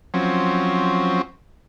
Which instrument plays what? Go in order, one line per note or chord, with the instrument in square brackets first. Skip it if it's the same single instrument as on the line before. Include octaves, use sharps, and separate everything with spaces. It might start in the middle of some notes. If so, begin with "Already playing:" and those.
[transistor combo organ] F3 F#3 C4 C#4